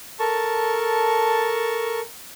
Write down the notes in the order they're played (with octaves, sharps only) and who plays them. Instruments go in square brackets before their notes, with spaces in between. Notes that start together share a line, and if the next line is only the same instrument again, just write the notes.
[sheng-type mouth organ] A4 A#4 A5 C#6